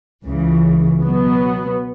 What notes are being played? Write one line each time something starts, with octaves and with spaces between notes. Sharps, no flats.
C#2 C#3 E3
B2 F#3 B3